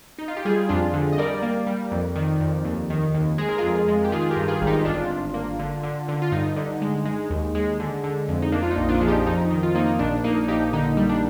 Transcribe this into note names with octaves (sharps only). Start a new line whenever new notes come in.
D#4
F4
G4
G3 F4 G#4
F2 D4 F4
D3
D#5
G3 A#4 D5
A#3
G3
F2
D#3
F2
D#2
D#3
D#2
G#3 G#4
A#4
F2 F4 G#4
G#3
G4
D#3 F4 G#4
G4 A#4
G2
F4 G#4
G#1
D#4 G4
G1 D4 F4
G1
A#3
D3
D3
D3
F4
G2 D#4
D3
G#3
G#3
D#2
G#3
D3
D3
F2
D#4
A#3 D4
F4
D#4
A#1
D4 F4
F3 G#4
D#4 G4
F2 D#4
D#3
F4
A#3 D#4
A#1 D4
A#3 D#4
A#1 D#4 G4
D3 D#4
G3
D4